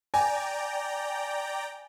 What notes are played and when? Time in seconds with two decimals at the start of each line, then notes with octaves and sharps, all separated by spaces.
0.14 D5 G5 G#5 A#5